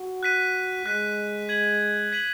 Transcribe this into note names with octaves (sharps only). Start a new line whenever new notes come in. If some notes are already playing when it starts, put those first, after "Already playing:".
Already playing: F#4
F#6 B6 D#7
G#3 F#6 B6 D#7
G#6 B6 D#7 F#7
G#6 B6 D#7 F#7